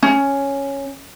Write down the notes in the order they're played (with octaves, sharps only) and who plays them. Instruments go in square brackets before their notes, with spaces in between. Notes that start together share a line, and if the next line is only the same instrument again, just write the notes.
[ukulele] C#4